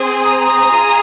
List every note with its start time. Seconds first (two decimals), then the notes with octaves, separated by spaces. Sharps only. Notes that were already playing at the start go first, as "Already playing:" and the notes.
Already playing: C4 G#4
0.24 A#5 D#6
0.70 F4 G#4